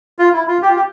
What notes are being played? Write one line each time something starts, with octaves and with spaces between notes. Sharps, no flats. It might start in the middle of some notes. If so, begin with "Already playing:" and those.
F4
E4
F4
G4
F4
G4